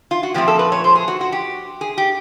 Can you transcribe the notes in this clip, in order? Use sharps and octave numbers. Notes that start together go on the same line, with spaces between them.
F4
F#4
A#2 F3 A3 C4 G4
A4
B4
C#5
C5
G#4
F#4
F#4
G4
G#4
G4